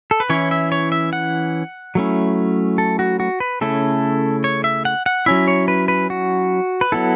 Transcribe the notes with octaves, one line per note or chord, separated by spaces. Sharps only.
A4
B4
E3 C#4 E4 C#5
E5
C#5
E5
F#5
F#3 A3 C#4 E4
A4
F#4
F#4
B4
C#3 A3 C#4 E4 A4
C#5
E5
F#5
F#5
F#3 C#4 E4 E5
C#5
B4
B4
F#4
B4
F#3 B3 E4 A4